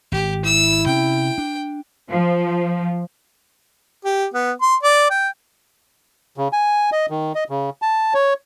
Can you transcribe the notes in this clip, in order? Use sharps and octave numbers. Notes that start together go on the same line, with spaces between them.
G#1 G4
E4 E6
C3 C#4 G5
D4
F3
G4
B3
C6
D5
G5
C#3
G#5
D#5
D#3
D#5
C#3
A5
C#5